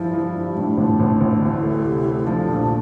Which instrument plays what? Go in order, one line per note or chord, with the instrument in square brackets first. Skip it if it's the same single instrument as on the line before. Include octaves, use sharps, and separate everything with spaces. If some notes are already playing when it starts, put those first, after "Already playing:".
Already playing: [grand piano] G2 F3 [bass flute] E4
[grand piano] F3
G2
[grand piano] A2 [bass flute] D4
[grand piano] A1
A1
A1
[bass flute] D4
[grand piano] D2 [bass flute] E4
[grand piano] A3
C3
A3
[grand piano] F3 [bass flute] D4
[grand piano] A#1